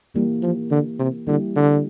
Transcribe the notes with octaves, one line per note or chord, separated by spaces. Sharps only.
E3 G3 A#3 E4 G4 A#4
F3
D3
C3
D3 G3 A#3 E4 G4
D3